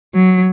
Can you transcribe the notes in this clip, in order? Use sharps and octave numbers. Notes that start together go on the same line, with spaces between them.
F#3